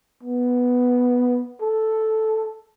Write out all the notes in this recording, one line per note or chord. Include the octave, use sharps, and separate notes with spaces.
B3
A4